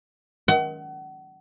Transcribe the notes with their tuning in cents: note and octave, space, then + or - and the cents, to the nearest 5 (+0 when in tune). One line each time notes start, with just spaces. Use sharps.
F#5 +35